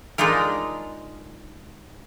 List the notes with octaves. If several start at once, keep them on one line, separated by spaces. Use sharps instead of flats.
G#3 D4 D#4 F4 A#4